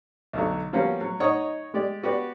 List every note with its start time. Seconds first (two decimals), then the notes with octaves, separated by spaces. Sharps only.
0.33 B1 D3 F#3
0.73 F3 G3 A#3 B3 C#4 F#4
1.01 F#3
1.20 D#4 C#5 D#5 F#5 C#6 D#6
1.74 G#3 G4 D5
2.03 B3 F#4 G4 B4 D5